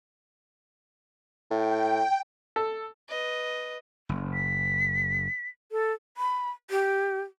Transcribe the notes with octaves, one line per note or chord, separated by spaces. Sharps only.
A2 G5
A4
B4 D#5
F#1
B6
A4
B5
G4